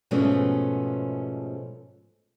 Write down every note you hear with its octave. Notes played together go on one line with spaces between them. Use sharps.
G#2 B2 F3 A3 B3 C#4